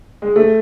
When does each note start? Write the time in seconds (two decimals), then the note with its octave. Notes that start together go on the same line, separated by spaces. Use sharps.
0.22 G#3
0.36 A3